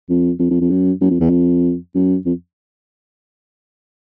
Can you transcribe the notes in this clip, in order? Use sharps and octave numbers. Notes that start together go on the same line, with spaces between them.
F2
F2
F2
F2
F#2
F#2
F2
E2
F2
F#2
F2